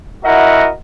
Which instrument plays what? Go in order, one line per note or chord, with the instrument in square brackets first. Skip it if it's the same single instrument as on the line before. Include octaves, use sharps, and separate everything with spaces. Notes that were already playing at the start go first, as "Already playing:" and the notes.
[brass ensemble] E4 F#4 A#4 D#5 E5 F#5